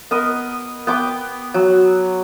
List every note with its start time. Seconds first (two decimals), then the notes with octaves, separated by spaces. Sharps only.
0.11 B3 A#4 D#5
0.87 B3 G5 D6
1.54 F#3